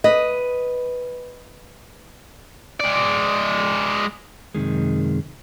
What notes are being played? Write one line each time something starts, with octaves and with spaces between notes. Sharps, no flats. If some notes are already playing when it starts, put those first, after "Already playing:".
B4 D#5
G#3 D5
F#2 C3 D#3 G#3